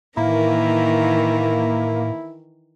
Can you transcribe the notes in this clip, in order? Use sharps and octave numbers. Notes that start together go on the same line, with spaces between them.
A2 D#3 E3 A#3 E4 A#4